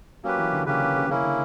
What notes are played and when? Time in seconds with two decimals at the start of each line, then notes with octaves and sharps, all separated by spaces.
0.24 F#3 A#3 C#4 G4 B4
0.38 E3
0.53 D3
0.66 C#3 A#3 C#4 G4 B4
0.81 C#3
0.95 C#3
1.09 C#3 A#3 C#4 E4
1.23 D3